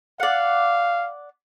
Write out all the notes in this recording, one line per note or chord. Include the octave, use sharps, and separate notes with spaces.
D5 F5 F#5